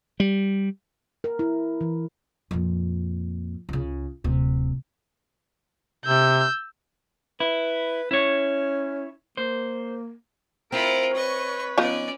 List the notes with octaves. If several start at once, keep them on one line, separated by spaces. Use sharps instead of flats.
G3
A#4
E4
E3
F2 A#2
C#2 C#3
D1 C3
C3 E6 G6
E4 B4
C#4 E4 C#5
A#3 C5
C4 E4 F4 A#4 D7
B4 C#5 D#5 C#6
F3 B3 C#4 D#4 D5